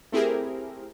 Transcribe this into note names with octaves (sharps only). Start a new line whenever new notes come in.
A3 C4 E4 G4 G#4 A#4